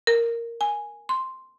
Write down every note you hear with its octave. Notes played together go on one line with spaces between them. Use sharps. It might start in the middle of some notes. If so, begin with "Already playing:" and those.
A#4
G#5
C6